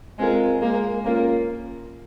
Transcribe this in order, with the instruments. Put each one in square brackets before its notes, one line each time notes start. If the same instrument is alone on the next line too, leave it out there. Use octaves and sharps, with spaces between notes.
[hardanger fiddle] G#3 [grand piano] C4 F4 A#4
[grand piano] G#3 [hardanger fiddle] A#3
[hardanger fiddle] A#3 [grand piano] C#4 F4 A#4